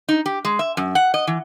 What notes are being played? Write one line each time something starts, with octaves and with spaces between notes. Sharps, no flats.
D#4
G4
G#3
E5
F#2
F#5
D#5
E3